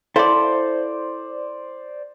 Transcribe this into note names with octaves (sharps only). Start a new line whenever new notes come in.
E4 A4 C5 D5 F5